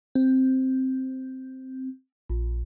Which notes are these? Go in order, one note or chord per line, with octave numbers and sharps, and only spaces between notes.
C4
A#1